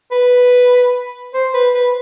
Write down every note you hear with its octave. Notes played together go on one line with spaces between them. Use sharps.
B4
C5
B4
B4